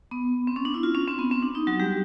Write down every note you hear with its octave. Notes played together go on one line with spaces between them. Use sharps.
B3
C4
C#4
D4
E4
F4
C#4
C4
B3
C4
D4
D#4
F#3 F#4
G3 G4